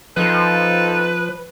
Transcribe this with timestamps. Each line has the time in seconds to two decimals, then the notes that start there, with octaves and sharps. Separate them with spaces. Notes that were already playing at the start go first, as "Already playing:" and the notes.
0.17 F3 C4 D#4 A4 B4